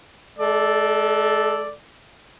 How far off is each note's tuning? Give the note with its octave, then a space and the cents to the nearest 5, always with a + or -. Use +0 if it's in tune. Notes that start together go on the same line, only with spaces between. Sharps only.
G#3 +40 A4 +0 D5 +0